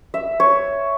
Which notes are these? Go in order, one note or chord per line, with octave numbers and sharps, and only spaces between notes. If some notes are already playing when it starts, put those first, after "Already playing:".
E5
C#5